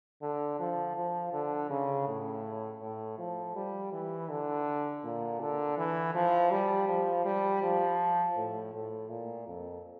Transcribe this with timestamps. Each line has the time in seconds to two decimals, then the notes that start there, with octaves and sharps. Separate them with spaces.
0.22 D3
0.60 F3
0.96 F3
1.33 D3
1.70 C#3
2.07 A2
2.81 A2
3.18 F3
3.55 G3
3.93 E3
4.29 D3
5.04 A#2
5.40 D3
5.78 E3
6.15 F3
6.51 G3
6.88 F3
7.25 G3
7.62 F3
8.36 A2
8.73 A2
9.10 A#2
9.48 F2